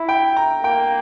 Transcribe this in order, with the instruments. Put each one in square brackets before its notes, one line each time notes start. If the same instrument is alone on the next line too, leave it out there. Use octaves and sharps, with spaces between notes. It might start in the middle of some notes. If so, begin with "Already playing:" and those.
Already playing: [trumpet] E4
[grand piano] G5
A#5
[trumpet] A#3 [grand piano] G5